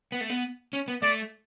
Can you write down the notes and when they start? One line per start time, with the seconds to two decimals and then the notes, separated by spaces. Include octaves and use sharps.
0.12 B3
0.21 A3
0.30 B3
0.73 C#4
0.88 B3
1.02 A3 D5